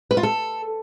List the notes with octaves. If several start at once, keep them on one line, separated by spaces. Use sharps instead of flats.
B4
F4
A4